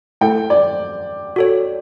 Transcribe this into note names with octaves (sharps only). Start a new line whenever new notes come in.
A3 E4 A4 G5
D5
F#4 A4 C#5